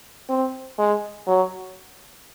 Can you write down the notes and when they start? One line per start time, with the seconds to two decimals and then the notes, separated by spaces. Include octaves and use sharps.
0.29 C4
0.79 G#3
1.27 F#3